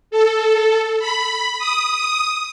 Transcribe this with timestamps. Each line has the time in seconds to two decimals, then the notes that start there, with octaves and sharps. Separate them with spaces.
0.11 A4
0.99 B5
1.58 D#6